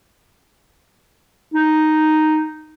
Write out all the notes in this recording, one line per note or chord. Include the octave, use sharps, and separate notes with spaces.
D#4